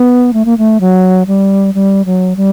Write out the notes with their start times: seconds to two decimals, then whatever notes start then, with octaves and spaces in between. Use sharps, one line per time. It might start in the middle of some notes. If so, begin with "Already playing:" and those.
Already playing: B3
0.33 A3
0.45 A#3
0.58 A3
0.81 F#3
1.27 G3
1.74 G3
2.05 F#3
2.36 G3